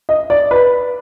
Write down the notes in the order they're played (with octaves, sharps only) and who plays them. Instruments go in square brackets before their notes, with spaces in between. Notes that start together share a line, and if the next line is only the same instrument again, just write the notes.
[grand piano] D#5
D5
B4